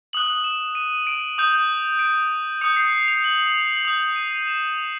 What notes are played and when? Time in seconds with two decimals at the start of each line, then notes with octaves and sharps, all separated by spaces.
0.13 D#6 F#6 F#7
0.44 E7
0.75 D#7
1.07 D7
1.38 D#6 G6
1.99 D7
2.61 D#6 G6 C#7
2.76 C7
2.92 C7
3.08 F7
3.24 F#7
3.54 F7
3.69 F#7
3.85 D#6 G6 F7
4.16 D#7
4.47 E7
4.78 F7